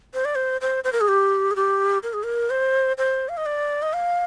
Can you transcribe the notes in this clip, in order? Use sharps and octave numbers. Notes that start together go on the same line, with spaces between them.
C5
D5
C5
C5
C5
A#4
G#4
G4
G#4
G4
A#4
G#4
A#4
C5
C5
F5
D#5
D5
D#5
F5